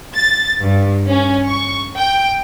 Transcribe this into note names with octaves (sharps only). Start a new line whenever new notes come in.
A6
G2
C#4
C#6
G5